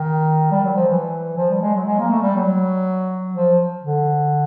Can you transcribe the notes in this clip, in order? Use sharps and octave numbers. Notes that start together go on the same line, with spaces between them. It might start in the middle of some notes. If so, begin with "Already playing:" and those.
Already playing: D#3
G3
F#3
F3
E3
F3
G3
G#3
F#3
G#3
A#3
A3
G3
F#3
F3
D3